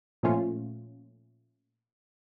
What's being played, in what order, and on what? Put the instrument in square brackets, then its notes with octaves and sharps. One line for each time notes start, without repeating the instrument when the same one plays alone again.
[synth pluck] A#2 F3 A3 C#4 F4